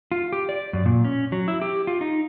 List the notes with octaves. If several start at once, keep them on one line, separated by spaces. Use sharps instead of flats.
F4
G4
D5
F#2
A#2
C#4
F#3
E4
G4
F4
D#4